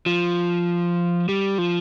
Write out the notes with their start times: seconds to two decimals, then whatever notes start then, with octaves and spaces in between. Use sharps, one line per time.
0.06 F3
1.29 G3
1.58 F3